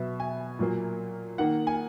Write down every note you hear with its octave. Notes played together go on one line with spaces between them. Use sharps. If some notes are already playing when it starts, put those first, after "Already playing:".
Already playing: B2 F#3 B3 E5
G#5
A#2 F#3 A#3
D#3 A#3 F#5
G#5